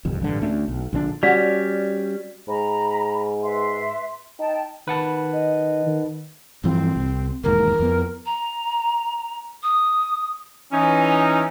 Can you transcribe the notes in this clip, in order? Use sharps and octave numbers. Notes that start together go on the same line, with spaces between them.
G1 C2 F2
A1 G2 D3
D2 A3 C#4 D4
B1
A#1 D3 E3 D4
G3 C#4 F#4 D5 B6
G#2 A#5 B5
B4 E5 C6
D#4 G5 A5
D#3 B4 F#5 A5 B5
D#5
D#3
G2 E3 F3 C4
C2
E1 D#2 G#2 A#4
F2 B3
A#5
D#6
E3 C#4 D#4